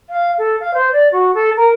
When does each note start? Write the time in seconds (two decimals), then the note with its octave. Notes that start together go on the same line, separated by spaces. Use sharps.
0.10 F5
0.38 A4
0.60 F5
0.74 C5
0.93 D5
1.12 F#4
1.34 A4
1.57 A#4